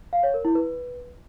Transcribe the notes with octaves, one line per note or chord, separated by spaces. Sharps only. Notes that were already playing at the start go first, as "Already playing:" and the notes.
F5
C#5
A#4
E4
B4